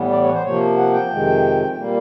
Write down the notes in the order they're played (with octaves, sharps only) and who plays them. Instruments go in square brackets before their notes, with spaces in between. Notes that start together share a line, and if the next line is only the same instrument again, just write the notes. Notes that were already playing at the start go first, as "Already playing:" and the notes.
Already playing: [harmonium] A2 E3 G3 B3
D5
C#5
B4
C5
C3 F3 A#3 C#5
F#5
G5
F2 C3 D#3 G#3
A#2 G3 A#3